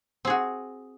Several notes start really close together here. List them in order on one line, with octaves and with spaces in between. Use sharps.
C4 G#4 F#4